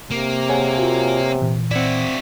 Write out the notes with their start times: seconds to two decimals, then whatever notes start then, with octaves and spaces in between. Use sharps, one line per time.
0.11 C3 A#3
0.49 G#4 C#5 F#5 G#5
0.78 F4 F#4
1.42 A#2 E3
1.71 C4 E4 F#4 D5